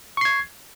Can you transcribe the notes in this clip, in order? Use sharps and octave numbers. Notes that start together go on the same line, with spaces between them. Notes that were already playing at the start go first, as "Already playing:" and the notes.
C#6 G#6 C7